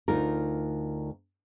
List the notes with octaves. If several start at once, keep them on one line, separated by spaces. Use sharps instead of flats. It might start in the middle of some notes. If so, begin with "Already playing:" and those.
D2 D#4 F4 A#4